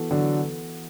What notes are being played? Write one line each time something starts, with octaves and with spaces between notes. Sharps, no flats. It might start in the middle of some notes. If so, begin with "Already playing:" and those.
Already playing: E3 B3 F#4 A4
D3 F#3